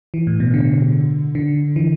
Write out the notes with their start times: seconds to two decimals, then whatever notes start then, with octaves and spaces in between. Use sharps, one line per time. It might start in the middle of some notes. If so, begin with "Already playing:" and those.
0.14 E3
0.27 A2
0.40 B2
0.54 D3
1.35 D3
1.76 E3